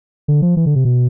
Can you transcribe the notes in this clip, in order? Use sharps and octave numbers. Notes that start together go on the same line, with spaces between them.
D3
F3
E3
D3
C3
B2